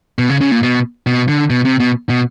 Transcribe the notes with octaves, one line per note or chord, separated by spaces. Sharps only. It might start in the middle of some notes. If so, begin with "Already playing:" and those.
B2
C#3
C#3
A#2
B2
B2
D3
B2
C3
B2
B2